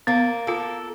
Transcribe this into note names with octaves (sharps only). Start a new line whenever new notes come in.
A#3 B3
F4 A4